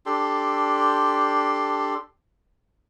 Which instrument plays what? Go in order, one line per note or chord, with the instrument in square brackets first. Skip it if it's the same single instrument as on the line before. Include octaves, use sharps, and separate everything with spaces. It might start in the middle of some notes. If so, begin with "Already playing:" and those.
[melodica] D4 G4 A4 C6